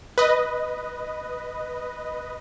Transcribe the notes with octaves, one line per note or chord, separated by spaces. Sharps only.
B4 D#5